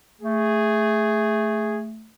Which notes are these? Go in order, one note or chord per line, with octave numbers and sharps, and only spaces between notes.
A3 G#4